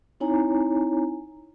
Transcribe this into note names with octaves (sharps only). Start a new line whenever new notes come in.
C4 D#4 E4 C#5 G#5 A#5